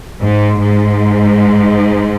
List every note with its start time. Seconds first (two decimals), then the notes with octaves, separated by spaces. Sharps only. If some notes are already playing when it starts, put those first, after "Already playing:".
0.20 G#2
0.61 G#2